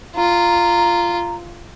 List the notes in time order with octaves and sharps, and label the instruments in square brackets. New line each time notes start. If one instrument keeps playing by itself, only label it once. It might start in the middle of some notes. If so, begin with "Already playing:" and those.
[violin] F4 [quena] A#5